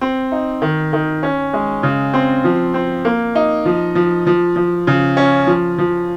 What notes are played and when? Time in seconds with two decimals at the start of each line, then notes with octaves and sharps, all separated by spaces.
0.01 C4
0.32 D#4
0.62 D#3
0.93 D#3
1.23 C#4
1.53 G#3
1.83 C#3
2.14 C4
2.44 F3
2.74 C4
3.05 A#3
3.35 D#4
3.65 F3
3.95 F3
4.27 F3
4.56 F3
4.87 C#3
5.17 C#4
5.47 F3
5.78 F3